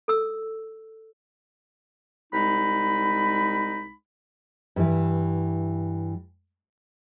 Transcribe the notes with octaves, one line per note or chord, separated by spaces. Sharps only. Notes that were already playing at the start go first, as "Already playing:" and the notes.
A4 E6
C2 G#3 D#4 B5
G2 E3